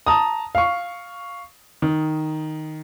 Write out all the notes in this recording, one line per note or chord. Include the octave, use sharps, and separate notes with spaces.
A5 A#5 D#6
F5 C#6
D#3